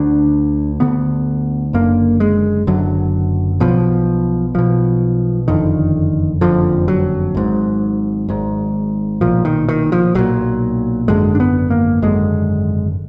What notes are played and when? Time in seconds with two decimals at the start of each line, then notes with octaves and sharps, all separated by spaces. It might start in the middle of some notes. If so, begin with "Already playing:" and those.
Already playing: D2 D3 D4
0.80 D2 D3 B3
1.73 F#1 F#2 D3 A#3
2.20 G#3
2.67 F#1 F#2 D3 F#3
3.60 B1 B2 F3
4.54 B1 B2 F3
5.48 F#1 F2 D3 D#3
6.41 F#1 F2 D3 F3
6.88 F#3
7.35 G#1 G#2
8.29 G#1 G#2
9.21 B1 A#2 F3
9.45 D#3
9.69 D#3
9.92 F3
10.15 B1 A#2 F#3
11.08 G#1 F#2 D3 G#3
11.35 D4
11.40 B3
11.70 A#3
12.02 G#1 F#2 D3 G#3